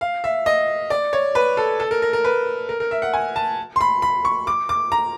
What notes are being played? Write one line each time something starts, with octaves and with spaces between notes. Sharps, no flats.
F5
E5
D#5
D5
C#5
B4
A4
A4
A#4
A#4
A#4
B4
A#4
A#4
E5
F#5
G#5
A5
C6
B5
B5
C#6
D6
D6
A#5